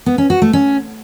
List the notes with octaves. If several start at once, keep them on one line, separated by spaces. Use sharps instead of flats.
B3
C#4
F#4
A3
C#4